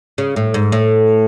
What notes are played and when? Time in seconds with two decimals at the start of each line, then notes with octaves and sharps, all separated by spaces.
0.18 C#3
0.36 A2
0.54 G#2
0.72 A2